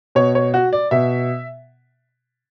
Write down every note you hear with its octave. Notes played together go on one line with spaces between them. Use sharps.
B2 C#5
C#5
F#4
D5
B2 E5